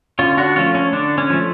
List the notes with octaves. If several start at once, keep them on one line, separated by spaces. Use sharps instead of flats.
D3 C#4 F4
D4 F#4
F3 A3 C#4 F4
C#4
D3 D4
C#4
F3 A3